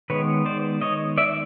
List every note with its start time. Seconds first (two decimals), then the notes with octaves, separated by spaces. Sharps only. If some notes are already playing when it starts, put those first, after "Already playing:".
0.10 D#3 G#3 B3 B4 C#5
0.46 C5 D5
0.81 C#5 D#5
1.18 D5 E5